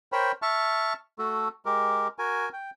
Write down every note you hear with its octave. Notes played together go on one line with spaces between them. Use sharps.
A#4 C5 C#5 G5 B5
E5 A5 C#6 F6
A3 F#4 A4
G#3 G4 A#4
F#4 A#4 G#5
G5